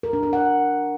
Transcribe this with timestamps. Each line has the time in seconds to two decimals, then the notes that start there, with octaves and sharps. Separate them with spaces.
0.03 A#4
0.13 D4
0.23 A#4
0.33 F#5